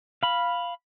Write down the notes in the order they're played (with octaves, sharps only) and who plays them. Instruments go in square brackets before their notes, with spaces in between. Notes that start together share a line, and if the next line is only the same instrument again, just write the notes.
[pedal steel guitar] F5 B5